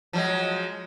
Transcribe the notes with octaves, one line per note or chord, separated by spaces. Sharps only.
F3 F#3 G#3